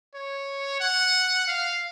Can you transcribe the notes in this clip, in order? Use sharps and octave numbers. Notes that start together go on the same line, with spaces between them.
C#5
F#5
F5